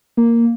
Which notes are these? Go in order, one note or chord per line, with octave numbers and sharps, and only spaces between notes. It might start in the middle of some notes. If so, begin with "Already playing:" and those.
A#3